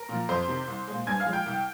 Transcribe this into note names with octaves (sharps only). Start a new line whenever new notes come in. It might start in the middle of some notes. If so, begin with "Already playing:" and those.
Already playing: A#4 A#5
A#2 F3
F2 C5 C6
C3 D#3
C2
A#2 G#3
G2 G#5 G#6
F5 F6
F3 G#3
G5 G6
C2